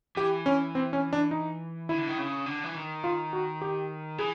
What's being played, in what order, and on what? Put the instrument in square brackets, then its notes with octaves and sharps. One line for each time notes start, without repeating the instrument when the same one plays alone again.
[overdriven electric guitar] E3 [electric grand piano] G4
[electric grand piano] C#4
C4
C#4
D4
D#4
[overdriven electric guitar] D#3 [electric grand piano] E4
[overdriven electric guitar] D3
D#3
C#3
D3
E3
D#3
[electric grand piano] F4
F#4
G4
[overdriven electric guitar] E3 [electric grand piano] G#4